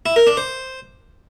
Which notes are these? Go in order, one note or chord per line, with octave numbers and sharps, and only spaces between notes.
E4
A#4
D4
C5